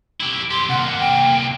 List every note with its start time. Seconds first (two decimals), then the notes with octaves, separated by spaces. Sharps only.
0.21 E4 G4
0.51 G4 A4 C6
0.69 C3 A#3 F#5
1.00 G5